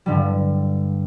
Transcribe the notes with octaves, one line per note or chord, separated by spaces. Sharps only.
G2 D3 G3